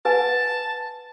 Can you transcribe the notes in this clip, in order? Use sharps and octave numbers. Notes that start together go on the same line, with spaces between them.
B4 F#5 G#5 A5